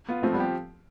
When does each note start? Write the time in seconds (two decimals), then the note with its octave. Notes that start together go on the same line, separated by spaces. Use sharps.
0.09 B3 F4
0.22 F3 A3 C4
0.33 G3 B3
0.37 C4 G4